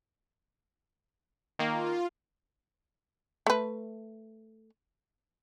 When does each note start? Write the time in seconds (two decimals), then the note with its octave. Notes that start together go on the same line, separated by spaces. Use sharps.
1.59 D#3 A#3 F4
3.47 A3 B4